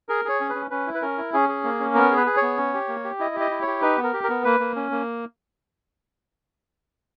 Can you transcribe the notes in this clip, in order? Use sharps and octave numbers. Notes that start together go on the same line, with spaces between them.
G#4 A#4
G#4 C#5
C#4
B4
C#4
C#4 B4
E4
B4
C#4 A#4
E4
C#4 G#4
G#4
A#3
C#4
B3 A#4
G#4
B4
G#4
C#5
B3
C#4
G4
A#3
G4
E4 D#5
G4
D#5
E4
G4 C#5
D#4 B4
B3
A#4
G4
A#4
B3
A#3 B4
A#3
C#4
A#3